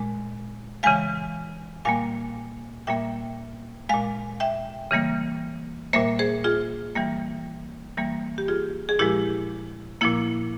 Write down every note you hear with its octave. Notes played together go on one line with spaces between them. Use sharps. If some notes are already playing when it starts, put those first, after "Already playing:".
Already playing: A#2 G#3
C#3 E3 G#3 F5 G#5
A#2 G3 A#3 F5 G#5
A#2 G3 A#3 E5 G5
A#2 G#3 F5 G#5
E5 G5
C#3 E3 G3 A#3
A#2 G3 A#3 C5 E5
G#4 C5
F4 G#4
E3 G3 A#3
E3 G3 A#3
G4
F4 G#4
G#4
A#2 F3 G#3 E4 G4
A#2 F3 A#3 E4